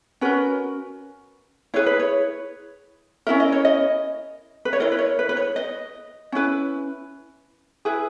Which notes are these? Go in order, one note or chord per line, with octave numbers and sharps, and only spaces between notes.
C#4 F#4 A#4 B4
E4 G#4 B4 C#5
B4
C#5
C#4 E4 A#4 E5
D#5
C#5
D#5
B4
C#5
E4 A#4 D#5
B4
C#5
B4
B4
C#5
D#5
C#4 E4 B4
E4 G#4 B4